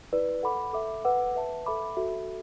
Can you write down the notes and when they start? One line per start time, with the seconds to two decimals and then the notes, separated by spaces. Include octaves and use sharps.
0.12 E4 B4 D5
0.43 A4 F#5 B5 D6
0.73 A4 E5 D6
1.05 B4 F#5 D6
1.35 B4 E5 A5
1.66 A4 E5 B5 D6
1.97 F#4 A4 E5